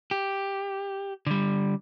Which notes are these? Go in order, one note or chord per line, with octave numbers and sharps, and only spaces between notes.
G4
D3 G3